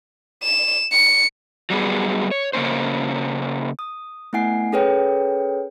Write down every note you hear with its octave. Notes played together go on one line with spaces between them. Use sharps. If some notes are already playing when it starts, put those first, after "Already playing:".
E7
C#7
F#3 G3 B3 G#4
C#5
C#3 A#3 C#4 C5
D#6
A3 B3 E4 F#5 G#5 C7
C#4 G#4 A4 B4 C#5 G5